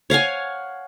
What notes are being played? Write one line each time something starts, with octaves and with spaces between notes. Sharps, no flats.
C#5 F5 F#5 G#5